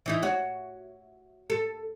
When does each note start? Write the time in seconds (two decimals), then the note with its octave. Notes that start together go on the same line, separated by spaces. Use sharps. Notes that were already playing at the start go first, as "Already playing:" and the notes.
0.06 E3 D#4 E4
0.22 F#4 C#5
1.50 A4